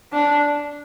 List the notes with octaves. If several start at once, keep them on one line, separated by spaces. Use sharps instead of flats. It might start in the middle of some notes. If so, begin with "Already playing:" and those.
D4